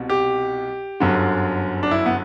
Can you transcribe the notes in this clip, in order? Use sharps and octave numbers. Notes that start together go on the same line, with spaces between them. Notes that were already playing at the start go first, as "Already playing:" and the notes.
Already playing: C2 B2
G4
G1 F#2 D3
D4
E4
B3